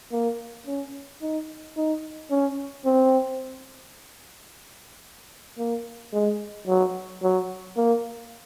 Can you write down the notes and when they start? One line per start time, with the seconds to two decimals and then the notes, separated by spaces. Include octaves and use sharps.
0.12 A#3
0.67 C#4
1.22 D#4
1.76 D#4
2.30 C#4
2.85 C4
5.58 A#3
6.13 G#3
6.67 F#3
7.22 F#3
7.76 A#3